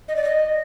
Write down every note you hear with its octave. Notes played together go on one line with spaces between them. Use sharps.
D#5
D5
D#5